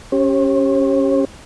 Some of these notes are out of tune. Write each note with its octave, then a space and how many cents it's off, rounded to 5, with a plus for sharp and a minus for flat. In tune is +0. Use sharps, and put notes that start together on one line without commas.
C#4 +0 G4 +0 C#5 -45